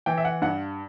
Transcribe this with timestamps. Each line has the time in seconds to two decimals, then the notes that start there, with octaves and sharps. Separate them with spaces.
0.06 E3 G5
0.18 E5
0.25 F#5
0.42 G2 F#5